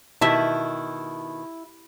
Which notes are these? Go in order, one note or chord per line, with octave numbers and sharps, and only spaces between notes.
B2 D#3 E4 G4 E5 A5